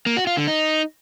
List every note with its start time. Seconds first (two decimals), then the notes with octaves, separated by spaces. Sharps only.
0.06 A#3
0.17 F#4
0.27 F4
0.37 D3
0.47 D#4